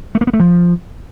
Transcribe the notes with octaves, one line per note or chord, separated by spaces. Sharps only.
A3
A#3
B3
A3
F3